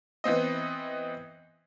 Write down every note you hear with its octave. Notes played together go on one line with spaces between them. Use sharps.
E3 B3 C4 D#5